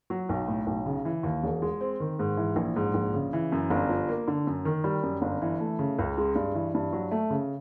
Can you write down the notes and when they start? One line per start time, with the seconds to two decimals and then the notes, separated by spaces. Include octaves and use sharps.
0.10 F#3
0.29 B1
0.48 A2
0.66 B1
0.86 C#3
1.05 E3
1.23 D#2
1.44 E1
1.62 G#3
1.81 C4
2.00 D#3
2.19 G#2
2.37 E3
2.56 A#1
2.76 G#2
2.94 A#1
3.14 C#3
3.33 E3
3.52 F#2
3.70 G1
3.89 F3
4.09 A#3
4.28 D3
4.47 F#2
4.65 D#3
4.84 G3
5.03 F#2
5.22 G1
5.42 E3
5.60 A3
5.79 C#3
5.99 C#2
6.18 G#3
6.35 G2
6.55 E3
6.75 G2
6.93 F#3
7.11 A3
7.30 C#3